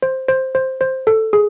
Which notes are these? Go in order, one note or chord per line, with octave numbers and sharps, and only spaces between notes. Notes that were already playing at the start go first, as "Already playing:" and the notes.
C5
C5
C5
C5
A4
G#4